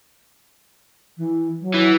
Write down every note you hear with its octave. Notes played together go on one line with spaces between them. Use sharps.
E3
F#3
E3